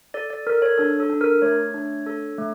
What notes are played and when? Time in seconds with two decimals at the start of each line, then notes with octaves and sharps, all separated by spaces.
0.14 A4 D5
0.30 D5
0.47 A4 A#4
0.62 C#5
0.78 D4 A4
1.00 A4
1.10 D4
1.21 A#4
1.42 A3 C#5
1.74 D4
2.06 A4
2.38 A3